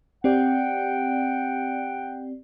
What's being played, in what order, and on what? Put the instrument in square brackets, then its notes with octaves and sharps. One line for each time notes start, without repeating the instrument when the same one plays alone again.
[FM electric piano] C4 G4 D5 [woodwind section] F#5 G5